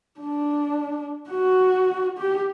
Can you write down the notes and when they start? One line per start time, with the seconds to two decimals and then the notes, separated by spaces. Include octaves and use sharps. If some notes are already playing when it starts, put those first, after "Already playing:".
0.21 D4
1.30 F#4
2.18 G4